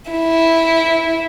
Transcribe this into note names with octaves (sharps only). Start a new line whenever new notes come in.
E4